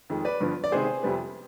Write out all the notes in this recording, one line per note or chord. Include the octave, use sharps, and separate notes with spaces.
F2 D#3 G#3
B4 D5
G2 D3 F3 B3
D5
C3 D#3 G#3 B3 G#4 C5
F2 C3 G3 B3